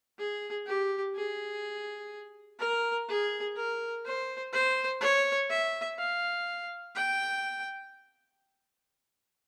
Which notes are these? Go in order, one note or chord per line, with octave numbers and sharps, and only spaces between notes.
G#4
G4
G#4
A#4
G#4
A#4
C5
C5
C#5
E5
F5
G5